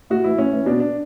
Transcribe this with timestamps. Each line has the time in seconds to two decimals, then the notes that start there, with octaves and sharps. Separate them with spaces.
0.10 A2 F#4
0.24 E3 E4
0.38 A2 C#4
0.53 E3
0.66 B2 D4
0.80 D4